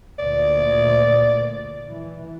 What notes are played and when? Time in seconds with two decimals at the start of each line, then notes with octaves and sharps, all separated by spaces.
0.19 D2 A#2 D5
1.90 E3